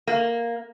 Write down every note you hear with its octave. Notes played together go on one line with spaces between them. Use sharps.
A#3